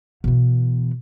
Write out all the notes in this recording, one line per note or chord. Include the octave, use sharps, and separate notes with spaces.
B2 E3